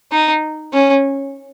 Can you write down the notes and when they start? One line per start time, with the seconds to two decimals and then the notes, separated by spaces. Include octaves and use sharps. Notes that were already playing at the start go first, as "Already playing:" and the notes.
0.12 D#4
0.74 C#4